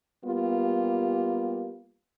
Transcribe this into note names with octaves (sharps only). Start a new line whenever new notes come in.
G3 A#3 B3 F4 G4